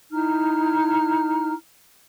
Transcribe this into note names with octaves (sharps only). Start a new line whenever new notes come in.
D#4 E4 A#5 F6